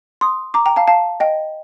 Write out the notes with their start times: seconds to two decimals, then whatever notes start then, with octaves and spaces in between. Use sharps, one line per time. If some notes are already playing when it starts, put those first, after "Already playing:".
0.21 C6 D#6
0.54 A#5 D6
0.66 G5 A#5
0.76 F5 A5
0.88 F5 A5
1.20 D#5 G5